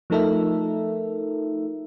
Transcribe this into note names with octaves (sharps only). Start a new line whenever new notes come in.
F3 A3 D#4 A4 A#4 E5